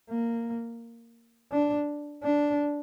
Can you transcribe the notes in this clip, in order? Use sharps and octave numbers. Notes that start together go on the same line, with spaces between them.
A#3
D4
D4